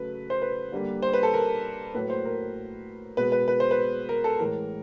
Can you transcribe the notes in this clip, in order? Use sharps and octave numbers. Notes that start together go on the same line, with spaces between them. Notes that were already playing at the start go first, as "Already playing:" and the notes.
Already playing: C#3 F#3 A3 B4
C5
B4
D3 G3 A#3
C5
B4
A4
A#4
A2 F#3 A#3 B4
C5
A#4
B2 G#3 B4
B4
B4
C5
B4
A#4
A4
A2 E3 G#3 A#4